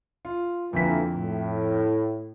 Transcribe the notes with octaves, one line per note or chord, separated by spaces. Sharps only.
F4
F2 D3 E3 A#3 B6
A2